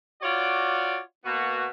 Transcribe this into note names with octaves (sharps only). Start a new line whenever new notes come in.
F4 F#4 C#5 D5
B2 A#3 B3 F#4